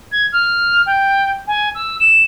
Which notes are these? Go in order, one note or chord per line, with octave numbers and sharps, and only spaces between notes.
G#6
F6
G5
G#5
E6
E7